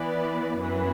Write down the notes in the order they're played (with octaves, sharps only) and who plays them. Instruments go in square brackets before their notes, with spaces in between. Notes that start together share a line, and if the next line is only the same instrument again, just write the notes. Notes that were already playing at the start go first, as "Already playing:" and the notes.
Already playing: [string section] E3 B3 E4 B4 D5
F#2 E3 B3 E4 B4